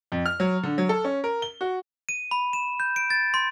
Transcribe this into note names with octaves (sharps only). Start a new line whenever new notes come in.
F2
F6
F#3
D3
F#3
A4
C#4
A#4
G7
F#4
D#7
B5
E7
G6
D7
A6
C6